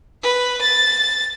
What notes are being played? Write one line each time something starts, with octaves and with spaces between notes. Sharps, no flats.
B4
A6